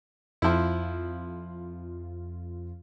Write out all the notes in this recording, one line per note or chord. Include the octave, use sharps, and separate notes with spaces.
F2 F3 E4 F4